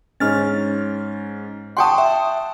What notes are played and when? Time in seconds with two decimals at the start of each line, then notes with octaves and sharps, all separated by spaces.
0.20 G#2 C#4 F6 A6
1.77 F#5 G5 A5 C6 C#6 D#6
1.98 E5